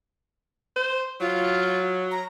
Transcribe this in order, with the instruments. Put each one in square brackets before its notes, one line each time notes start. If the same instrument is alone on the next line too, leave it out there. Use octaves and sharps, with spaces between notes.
[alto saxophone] C5
[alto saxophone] F#3 [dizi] F4
[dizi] A#5